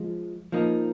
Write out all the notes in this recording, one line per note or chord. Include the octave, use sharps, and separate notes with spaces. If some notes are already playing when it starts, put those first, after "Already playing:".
Already playing: F3 G#3
F3 A#3 D#4